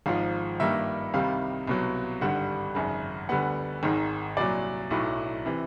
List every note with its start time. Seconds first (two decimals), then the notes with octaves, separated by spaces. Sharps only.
0.06 G#1 G#2 F3 F5
0.60 G2 D#3 G3 A#3 E5
1.14 C2 C3 D#3 G3 F5
1.68 C2 B2 F#3
2.21 G#1 G2 D3 G3 F#5
2.75 G#1 F#2 C#3
3.29 D2 D3 G3 B3 F#5
3.83 G#1 G#2 D#3 G#3
4.37 C2 A#2 F#3 D5
4.90 B1 A2 F#3 A3
5.46 C3 E3